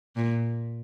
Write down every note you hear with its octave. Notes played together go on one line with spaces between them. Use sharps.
A#2